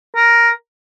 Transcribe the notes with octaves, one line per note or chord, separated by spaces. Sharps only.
A#4